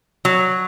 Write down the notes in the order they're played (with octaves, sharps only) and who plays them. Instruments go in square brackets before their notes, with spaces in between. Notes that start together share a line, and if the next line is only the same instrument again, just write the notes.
[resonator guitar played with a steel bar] F#3